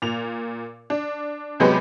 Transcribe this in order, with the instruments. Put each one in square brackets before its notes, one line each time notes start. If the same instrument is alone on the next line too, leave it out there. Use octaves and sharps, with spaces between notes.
[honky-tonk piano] A#2 F7
D4
C3 F#3 G#3 B3 G4 B4